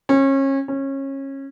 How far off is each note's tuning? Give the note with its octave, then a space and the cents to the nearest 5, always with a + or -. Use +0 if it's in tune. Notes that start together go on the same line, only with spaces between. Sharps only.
C#4 -30
C#4 -25